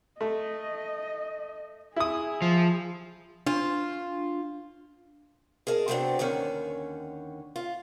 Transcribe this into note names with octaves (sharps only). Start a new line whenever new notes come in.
A3 D#5
E4 G#4 D#6
F3
D4 F4
G#4 A#4 D#5 A5
C3 F#3 A3 B3 C4 D4
D#2 D3 D#3 C#4
F4